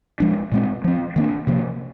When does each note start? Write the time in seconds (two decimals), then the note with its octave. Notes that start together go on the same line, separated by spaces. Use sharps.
0.20 F3 G#3 D4
0.52 A#2 G#3 C4
0.84 F3 C4
1.16 D#3 A#3 D4
1.47 C3 F3 A#3